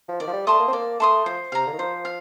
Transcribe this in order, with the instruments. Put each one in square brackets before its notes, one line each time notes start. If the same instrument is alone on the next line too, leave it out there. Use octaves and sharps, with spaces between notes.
[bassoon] F3
[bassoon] D#3 [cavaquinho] D5
[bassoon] F3
G3
[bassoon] A3 [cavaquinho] A5 C6 D#6
[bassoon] A#3
C4
[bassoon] A#3 [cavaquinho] D5
[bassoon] A3 [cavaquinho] A5 C6 D#6
[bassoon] F3 [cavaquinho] C5
[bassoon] C3 [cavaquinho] F5 A#5
[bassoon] D3
D#3
[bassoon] F3 [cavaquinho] C5
[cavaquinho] F5